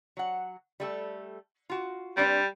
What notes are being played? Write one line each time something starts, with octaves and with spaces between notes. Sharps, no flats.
F#3 F#5
G3 A3 A4
F4 F#4
G3 C4 D4 B4